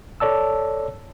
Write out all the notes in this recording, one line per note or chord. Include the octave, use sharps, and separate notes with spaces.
A4 C#5 D5 A5 E6